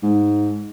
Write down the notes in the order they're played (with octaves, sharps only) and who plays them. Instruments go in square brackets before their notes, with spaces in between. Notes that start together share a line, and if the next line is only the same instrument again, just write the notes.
[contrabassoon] G#2